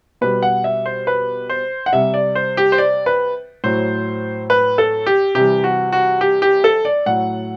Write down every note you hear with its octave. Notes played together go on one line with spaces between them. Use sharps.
B2 G3 B4
F#5
E5
C5
B4
C5
F#5
C3 G3 E5
D5
C5
G4
C5
D5
B4
A2 F#3 C5
B4
A4
G4
C3 E3 G3 G4
F#4
F#4
G4
G4
A4
D5
A2 F#3 F#5